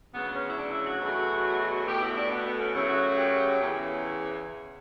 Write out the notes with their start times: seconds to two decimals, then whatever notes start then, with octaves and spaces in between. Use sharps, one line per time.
0.13 D2 C#3 F#3 B3
0.34 C#4
0.48 E4
0.57 D4
0.70 E4
0.86 F#4
1.00 E2 B2 F#3 A3
1.87 B2 A3 G4
2.01 E4
2.16 D4
2.30 B3
2.44 B3
2.60 C#4
2.73 F#2 C#3 F#3 A3 E4
2.89 F#4
3.02 F#4
3.18 G4
3.61 E2 C#3 E3